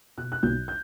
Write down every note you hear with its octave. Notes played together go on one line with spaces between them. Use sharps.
B2 F#6
F#6
B1 G6
G6